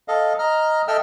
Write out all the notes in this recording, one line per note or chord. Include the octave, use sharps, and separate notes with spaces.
A4 D#5 F5
D#5 A#5 F6
A4 D#5 E5 G5 E6 F6